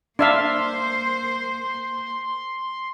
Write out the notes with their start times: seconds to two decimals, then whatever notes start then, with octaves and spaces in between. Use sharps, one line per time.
0.19 A#3 D4 C5 E5 F5 C6